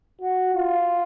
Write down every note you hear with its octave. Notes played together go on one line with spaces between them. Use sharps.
F#4
F4